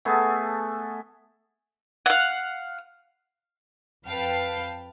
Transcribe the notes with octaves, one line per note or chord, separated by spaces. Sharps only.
A3 B3 G#4 A4
F5 F#5
F2 B4 F5 G5 A5 C7